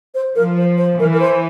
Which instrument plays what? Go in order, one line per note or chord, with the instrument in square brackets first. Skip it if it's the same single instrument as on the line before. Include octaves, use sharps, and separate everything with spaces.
[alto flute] C5
[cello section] F3 [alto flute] A#4
[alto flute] C5
C5
[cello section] E3 [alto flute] A#4
[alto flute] A#4
C5